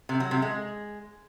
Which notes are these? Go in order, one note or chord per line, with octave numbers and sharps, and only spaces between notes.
C3
F#3
C3
G#3